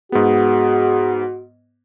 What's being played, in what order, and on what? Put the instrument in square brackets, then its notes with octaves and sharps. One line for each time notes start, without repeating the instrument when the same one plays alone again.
[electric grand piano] G#2 B3 [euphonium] F#4 [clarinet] G#4